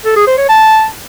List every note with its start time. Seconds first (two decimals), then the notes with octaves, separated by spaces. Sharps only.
0.05 A4
0.16 G#4
0.27 C5
0.38 C#5
0.49 A5